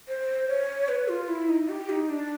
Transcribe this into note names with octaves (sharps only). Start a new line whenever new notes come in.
C5
C#5
B4
F4
E4
D#4
G4
D#4
D4